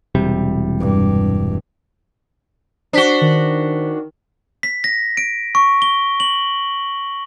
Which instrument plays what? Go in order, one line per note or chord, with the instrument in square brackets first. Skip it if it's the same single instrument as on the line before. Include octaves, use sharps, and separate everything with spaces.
[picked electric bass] E1 C3 G3
[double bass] G2
[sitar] D4 F#4 [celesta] C5 B6 G7
[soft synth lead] D#3
[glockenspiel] B6
A#6
D7
C#6
G7
F#7